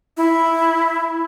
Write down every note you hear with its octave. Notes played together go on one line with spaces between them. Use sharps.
E4